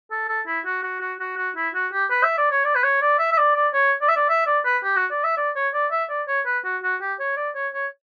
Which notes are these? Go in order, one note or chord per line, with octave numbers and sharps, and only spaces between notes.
A4
A4
E4
F#4
F#4
F#4
F#4
F#4
E4
F#4
G4
B4
E5
D5
C#5
D5
B4
C#5
D5
E5
E5
D5
D5
C#5
D5
E5
D5
E5
D5
B4
G4
F#4
D5
E5
D5
C#5
D5
E5
D5
C#5
B4
F#4
F#4
G4
C#5
D5
C#5
C#5